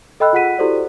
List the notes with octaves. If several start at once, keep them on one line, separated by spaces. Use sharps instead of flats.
A4 D#5 G5 B5 E6 F#6
F4 G#4 F#5 F#6 B6 D#7
E4 F#4 G4 A4 C5 D5